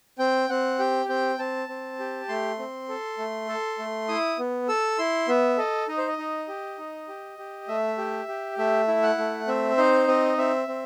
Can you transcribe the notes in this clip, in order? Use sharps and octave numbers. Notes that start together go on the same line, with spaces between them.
C4 G5
C4 F#5
G4 G5
C4 G5
C4 A5
C4
G4
A3 C6
C4
A4
A3
A4
A3
E4 D#6
B3
A4 E6
E4 C6
B3 E5
A4 D#5
D#4 D#5
C5
D#5
D#4
G4
D#4
G4
G4
A3 E5
G4
G4
A3 E5
E4
F#5
A3
C4 E5
D#4 C5
C4 D#5
C4 E5
C4